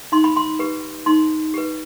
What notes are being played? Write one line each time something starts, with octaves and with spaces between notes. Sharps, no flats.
D#4 C6
B5
C6
G4 B4
D#4 C6
G4 B4